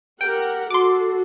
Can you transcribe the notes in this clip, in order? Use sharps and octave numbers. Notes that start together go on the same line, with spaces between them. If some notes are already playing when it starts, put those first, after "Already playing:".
G4 A#4 F#5 G5
F#4 A4 C6 D6